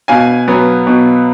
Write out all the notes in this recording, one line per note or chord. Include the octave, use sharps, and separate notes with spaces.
B2 F5 G#5
F#3 B3
B2